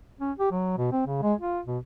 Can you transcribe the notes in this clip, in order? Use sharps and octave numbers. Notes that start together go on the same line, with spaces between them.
C#4
G4
F#3
B2
C4
C#3
G#3
F4
B2